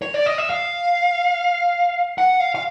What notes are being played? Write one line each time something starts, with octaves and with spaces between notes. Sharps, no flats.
C#5
D5
D#5
E5
F5
F#5
F5
F5